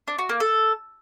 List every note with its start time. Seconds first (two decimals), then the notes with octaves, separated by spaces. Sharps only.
0.08 D4
0.18 F#4
0.29 A#3
0.40 A4